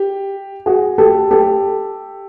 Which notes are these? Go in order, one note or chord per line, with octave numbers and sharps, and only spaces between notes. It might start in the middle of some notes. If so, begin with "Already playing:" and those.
Already playing: G4
F#4 G#4
G4 A4
G4 A4